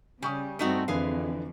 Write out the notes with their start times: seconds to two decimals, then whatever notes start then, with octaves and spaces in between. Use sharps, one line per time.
0.22 C#3 G3 G#5 C#6 D#6
0.59 G2 A3 C4 D#4 F#4
0.88 F2 D3 E3 G#4 B4 F5